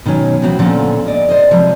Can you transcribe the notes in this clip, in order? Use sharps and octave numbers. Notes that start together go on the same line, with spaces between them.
B2 D#3 F#3 C#4
C#3 E3 F#3 B3 C4 F#4
A#2 D3 F3 C#4 A4 F#5
A#2 D5 D#5
C5 D5 D#5
C3 F3 F#3 G#3